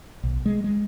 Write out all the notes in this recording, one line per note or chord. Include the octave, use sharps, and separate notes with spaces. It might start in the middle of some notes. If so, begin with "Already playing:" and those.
B1
G#3
G#3